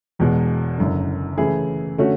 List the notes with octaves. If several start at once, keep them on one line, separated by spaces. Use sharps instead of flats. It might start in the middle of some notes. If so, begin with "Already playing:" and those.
E1 E2 B2 G#3
F#1 F#2 D3
C#3 E3 A3 E4 G#4
D3 A3 C#4 F#4